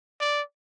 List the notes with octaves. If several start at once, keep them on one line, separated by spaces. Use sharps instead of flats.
D5